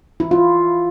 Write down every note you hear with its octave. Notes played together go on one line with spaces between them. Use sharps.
E4
F4